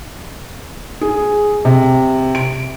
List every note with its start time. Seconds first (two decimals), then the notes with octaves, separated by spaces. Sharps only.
1.01 G#4
1.65 C3
2.35 D7